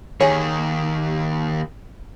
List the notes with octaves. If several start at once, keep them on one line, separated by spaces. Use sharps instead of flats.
D#2 D#3 G#4 C#5